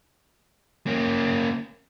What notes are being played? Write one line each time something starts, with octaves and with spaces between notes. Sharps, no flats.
A#3 C#4